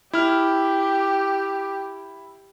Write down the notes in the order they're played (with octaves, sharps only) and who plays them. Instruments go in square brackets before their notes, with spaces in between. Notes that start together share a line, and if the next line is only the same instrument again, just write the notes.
[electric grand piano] E4 F6 [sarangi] G4